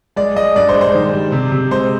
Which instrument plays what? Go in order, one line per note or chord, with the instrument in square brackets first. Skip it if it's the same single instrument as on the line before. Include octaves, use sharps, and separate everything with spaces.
[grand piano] G#3 D5
G#3 D#5
G2 D5
C5
G#3
C5
D#3
G3
C3
C3
G#3 C5